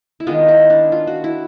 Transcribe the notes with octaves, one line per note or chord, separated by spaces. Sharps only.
E4
D#3 G#3 B3 F4
E4
D4
F4
F#4
E4